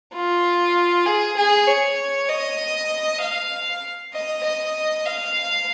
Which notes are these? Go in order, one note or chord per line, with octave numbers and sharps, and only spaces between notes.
F4
G#4
G#4
C#5
D#5
F5
D#5
D#5
F5